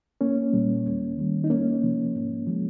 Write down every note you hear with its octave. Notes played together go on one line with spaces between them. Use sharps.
C2 A#3 C#4
A#2 G3
D#2
D#3 G3
D#4
C#2 A#3 C#4
C3 F3
G#2
F3 G#3